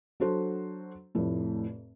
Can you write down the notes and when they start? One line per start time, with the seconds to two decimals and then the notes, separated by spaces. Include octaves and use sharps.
0.20 F#3 D4 F#4 A4 C5
1.15 F1 F2 A2